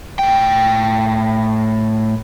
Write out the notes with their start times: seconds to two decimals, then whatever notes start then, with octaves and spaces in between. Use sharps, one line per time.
0.19 A2 G5